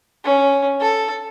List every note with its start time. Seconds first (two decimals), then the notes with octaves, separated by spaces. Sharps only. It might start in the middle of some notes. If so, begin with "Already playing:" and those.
0.24 C#4
0.81 A4